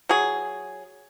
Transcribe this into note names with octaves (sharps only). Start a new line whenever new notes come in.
F#3 G#4